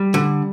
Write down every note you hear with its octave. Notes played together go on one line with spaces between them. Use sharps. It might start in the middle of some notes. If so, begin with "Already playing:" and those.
Already playing: G3
D3